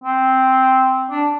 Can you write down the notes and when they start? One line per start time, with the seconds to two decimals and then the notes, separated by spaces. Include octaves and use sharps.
0.04 C4
1.11 D4